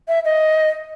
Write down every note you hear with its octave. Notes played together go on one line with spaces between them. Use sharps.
E5
D#5